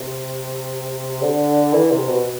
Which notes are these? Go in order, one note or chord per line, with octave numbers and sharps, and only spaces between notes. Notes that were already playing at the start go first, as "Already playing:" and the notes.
Already playing: C3
D3
E3
C3
B2